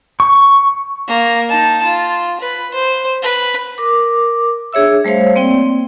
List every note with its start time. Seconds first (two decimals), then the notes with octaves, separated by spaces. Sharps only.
0.20 C#6
1.08 A#3
1.49 D#4 A5
1.83 F4
2.40 B4
2.74 C5
3.23 B4
3.78 A#4 D6
4.73 D4 G#4 C#5 E5 E6
5.05 G3 A3 C5 C#5 F5
5.36 A#3 C4 D5 G5